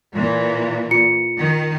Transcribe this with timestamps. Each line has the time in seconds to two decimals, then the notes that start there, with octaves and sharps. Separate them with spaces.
0.13 A#2 E3
0.91 F4 C#7
1.39 D#3